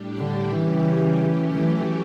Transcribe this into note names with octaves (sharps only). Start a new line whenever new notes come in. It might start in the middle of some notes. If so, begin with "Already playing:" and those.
Already playing: A2 G3 D4 G4
D3
C#3 E3 G3 C#4 G4
F#3 A3 C#4 G4
E3